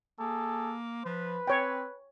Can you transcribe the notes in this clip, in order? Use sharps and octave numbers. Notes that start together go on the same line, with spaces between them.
A#3 G#4 A4
F3 B4
C4 C#5 G5